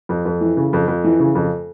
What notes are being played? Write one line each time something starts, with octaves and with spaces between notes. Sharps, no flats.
F2
F2
E3
C#3
F2
F2
E3
C#3
F2